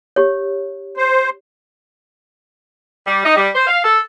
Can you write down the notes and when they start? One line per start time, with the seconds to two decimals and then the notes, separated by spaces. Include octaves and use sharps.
0.16 G4 C#5
0.97 C5
3.06 G3
3.24 D#4
3.36 G3
3.55 C5
3.67 F5
3.84 A4